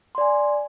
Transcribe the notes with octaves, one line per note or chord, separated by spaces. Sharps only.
D5 G#5 C6